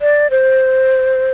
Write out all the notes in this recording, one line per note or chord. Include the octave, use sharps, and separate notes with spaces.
D5
C5